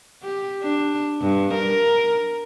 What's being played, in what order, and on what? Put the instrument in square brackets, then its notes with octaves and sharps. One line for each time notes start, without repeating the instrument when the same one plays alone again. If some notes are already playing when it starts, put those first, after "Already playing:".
[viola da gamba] G4
D4
G2
A#4